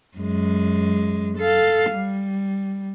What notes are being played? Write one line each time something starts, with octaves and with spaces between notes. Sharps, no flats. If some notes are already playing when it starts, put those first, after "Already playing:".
F#2 G#3
A4 F5
G3